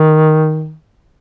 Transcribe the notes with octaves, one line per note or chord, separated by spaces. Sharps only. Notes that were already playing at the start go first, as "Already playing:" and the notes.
Already playing: D#3